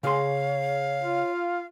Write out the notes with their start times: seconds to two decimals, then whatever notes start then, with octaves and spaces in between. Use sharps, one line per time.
0.03 C#3 G#4 C#5 F5 C6
1.03 F4